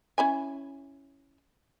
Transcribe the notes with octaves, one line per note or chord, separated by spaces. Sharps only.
C#4 E4 G#5